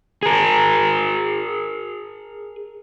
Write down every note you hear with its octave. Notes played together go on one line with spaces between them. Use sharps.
G#4 A#4